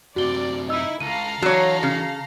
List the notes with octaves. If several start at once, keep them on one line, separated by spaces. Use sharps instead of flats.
F#2 C3 F#4 D5 G7
D#4 E4 D#5 E6
C#2 A4 F5 A#5 D#7
E3 F#3 F#4 A#4 C#5
C#3